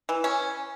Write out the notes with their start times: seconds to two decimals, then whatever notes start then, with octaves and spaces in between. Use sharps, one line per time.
0.09 E3
0.24 C#4